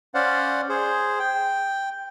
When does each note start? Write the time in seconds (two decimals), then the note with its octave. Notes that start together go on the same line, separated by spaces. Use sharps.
0.14 C#4 C5 D5 F5 F#5
0.69 G#4 C5
1.19 G5